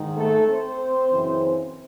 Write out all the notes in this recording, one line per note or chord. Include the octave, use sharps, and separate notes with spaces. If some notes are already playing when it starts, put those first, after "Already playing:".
Already playing: G#2 D#3
A3 A4
C4 C5
F#2 C#3 E3